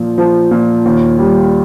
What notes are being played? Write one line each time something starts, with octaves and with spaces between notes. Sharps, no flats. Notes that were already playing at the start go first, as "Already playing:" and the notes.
Already playing: A#2 F3
F3
A#2
D#2
G3